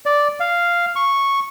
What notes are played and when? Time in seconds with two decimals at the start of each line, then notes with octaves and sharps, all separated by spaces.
0.06 D5
0.40 F5
0.96 C#6